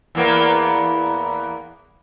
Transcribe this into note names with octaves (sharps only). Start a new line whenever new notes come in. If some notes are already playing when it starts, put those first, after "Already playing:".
E2 A#3 B3